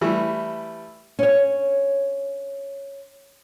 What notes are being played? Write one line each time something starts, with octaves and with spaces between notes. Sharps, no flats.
E3 G3 A3 E4
C#4 C#5